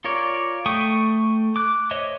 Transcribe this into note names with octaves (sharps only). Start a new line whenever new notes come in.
F4 A#4 C#5 D5
A3 G5 C#6 D#6
D6 F#6
C5 C#5 D#5 E5